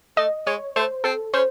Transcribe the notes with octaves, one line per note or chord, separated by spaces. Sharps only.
A3 D#5
G#3 C#5
A3 C5
C4 A4
C#4 C5